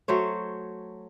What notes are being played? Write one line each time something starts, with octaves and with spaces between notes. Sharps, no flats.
F#3 A3 C5 C#5